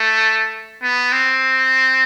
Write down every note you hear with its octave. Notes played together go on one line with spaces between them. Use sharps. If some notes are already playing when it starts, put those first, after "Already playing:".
Already playing: A3
B3
C4